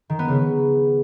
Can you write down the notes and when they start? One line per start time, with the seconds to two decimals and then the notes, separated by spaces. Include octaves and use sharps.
0.10 D#3
0.19 B3
0.29 C#3